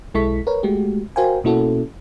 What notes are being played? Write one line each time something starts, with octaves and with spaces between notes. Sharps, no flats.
B1 G#3 E4 A4 C#6 B6
A#4 B4 C#5
G#3 A3 F#4 G4
F#4 A#4 C5 F5 G5 G#5
B2 A#3 C#4 E4 F#4 A4